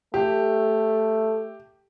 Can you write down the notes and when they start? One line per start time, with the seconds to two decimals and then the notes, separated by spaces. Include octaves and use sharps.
0.14 A3 G4